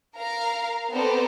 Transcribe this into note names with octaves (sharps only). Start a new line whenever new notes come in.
A#4 F5 A#5
B3 C4 A4 C5 D5 A#5